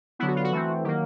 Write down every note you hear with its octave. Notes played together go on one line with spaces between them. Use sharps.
D3 F#3 B3 E4
F#4
F4
F#4
E3 A3 C4
D#3 F#3 A#3 G4